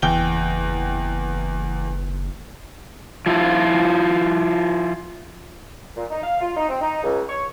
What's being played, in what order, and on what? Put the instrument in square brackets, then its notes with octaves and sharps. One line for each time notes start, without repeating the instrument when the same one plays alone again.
[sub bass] F#1 [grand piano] E2 G5 G7
[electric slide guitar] F3 E4 F4
[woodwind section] A#2
D#4
F5
F4
D#4
C4
D#4
C#2
C#5